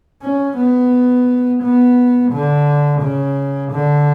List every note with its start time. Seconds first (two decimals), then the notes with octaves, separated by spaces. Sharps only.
0.22 C#4
0.57 B3
1.63 B3
2.32 D3
3.01 C#3
3.72 D3